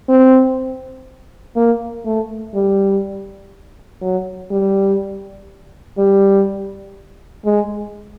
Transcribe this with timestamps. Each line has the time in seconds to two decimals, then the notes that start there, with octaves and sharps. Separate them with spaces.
0.09 C4
1.57 A#3
2.06 A3
2.54 G3
4.02 F#3
4.51 G3
5.98 G3
7.45 G#3